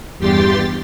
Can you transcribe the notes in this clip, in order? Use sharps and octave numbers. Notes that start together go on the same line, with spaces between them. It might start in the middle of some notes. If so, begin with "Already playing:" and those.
E2 G2 G4 G5 C6 A6